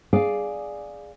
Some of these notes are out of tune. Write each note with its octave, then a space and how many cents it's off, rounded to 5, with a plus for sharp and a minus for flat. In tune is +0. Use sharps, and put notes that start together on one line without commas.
G#4 +0 D5 +0 F5 +0